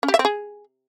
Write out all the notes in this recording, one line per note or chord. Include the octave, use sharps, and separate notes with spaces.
C#4
G4
E5
C4
G#4